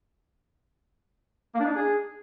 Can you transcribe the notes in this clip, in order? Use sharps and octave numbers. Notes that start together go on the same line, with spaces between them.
A#3
D4
D#4
D4
G#4